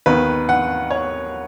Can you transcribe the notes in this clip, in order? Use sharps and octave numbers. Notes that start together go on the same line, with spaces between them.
D#2 D#3 B3 B4
F#5
C#5